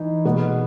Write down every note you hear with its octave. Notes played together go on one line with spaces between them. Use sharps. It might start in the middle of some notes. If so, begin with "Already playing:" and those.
Already playing: E3 D#4
B2 G#3 B3